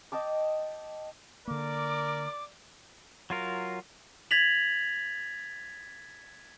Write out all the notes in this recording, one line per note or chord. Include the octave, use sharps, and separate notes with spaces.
D#5 G5 A5 D6
D3 A#3 A#4 D5 D6
F#3 F4 A#4
G#6 A6 B6 F7 F#7